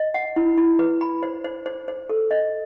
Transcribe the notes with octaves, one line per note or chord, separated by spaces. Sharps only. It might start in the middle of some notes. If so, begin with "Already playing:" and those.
Already playing: D#5
F#5
E4
E4
B4
B5
C5
C5
C5
C5
A4
D#5